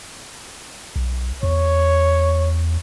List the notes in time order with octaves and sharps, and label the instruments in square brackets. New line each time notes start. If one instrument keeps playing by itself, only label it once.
[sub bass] B1
[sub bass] E2 [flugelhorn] C#5